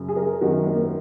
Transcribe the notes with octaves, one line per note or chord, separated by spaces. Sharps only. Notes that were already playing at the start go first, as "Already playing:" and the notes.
Already playing: F#2 C#3
G#4
A#4
F#2 D#3 F#4
A#3